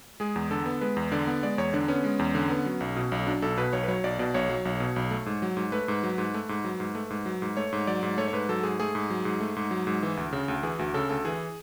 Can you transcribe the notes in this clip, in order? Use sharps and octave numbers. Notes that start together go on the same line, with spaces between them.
G#3 G#4
E2
D3 A4
B3
G#3 B4
E2
D3 D5
B3
G#3 D5
E2 C#5
D3 D4
B3 C#4
G#3
E2
D3
B3
F#3
B1
B2
B1
F#3 D4
B1 A4
B2 B4
B1 C#5
B4
F#3 C#5
B1 D5
B2 D5
B1 C#5
F#3
B1
B2
B1
A3
G#2
F#3
G#2
A3 B4
G#2
F#3
G#2
A3
G#2
F#3
G#2
A3
G#2
F#3
G#2
A3 C#5
G#2
F#3 D5
G#2
A3 C#5
C#5
G#2 B4
F#3 A4
G#2 G#4
A3 G#4
G#2
F#3
G#2
A3
G#2
F#3
G#2
E3
D2
C#3
D2
E3 G#4
D2 F#4
C#3 A4
D2 A4
E3 G#4